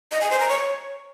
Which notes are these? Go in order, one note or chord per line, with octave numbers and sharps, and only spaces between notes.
D#5
G#5
C5
A#5
C#5